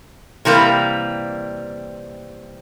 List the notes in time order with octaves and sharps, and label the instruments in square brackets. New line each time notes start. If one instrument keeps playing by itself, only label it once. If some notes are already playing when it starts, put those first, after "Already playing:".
[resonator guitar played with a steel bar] C3 E3 G3 A#3